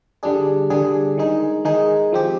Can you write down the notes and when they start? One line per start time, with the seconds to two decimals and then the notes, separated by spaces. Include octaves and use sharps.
0.23 D3 G3 D4 G#4
0.70 D3 G3 D4 G#4
1.18 D#3 G#3 D#4 G#4
1.65 D#3 G#3 D#4 G#4
2.12 F3 C4 G4